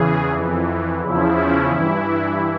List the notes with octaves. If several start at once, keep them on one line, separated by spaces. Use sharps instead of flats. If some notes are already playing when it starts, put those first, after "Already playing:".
Already playing: E2 C#3 E3 G#4
F2 E3
E2 C#3 F3 E4
C#4
G2 E3 E4